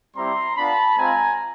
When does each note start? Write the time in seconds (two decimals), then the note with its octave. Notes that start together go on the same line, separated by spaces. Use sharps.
0.17 G3 C4 E4 G4 A#5 C6
0.57 B3 D4 F4 A5 B5
0.97 G#3 C4 F4 G#5 A#5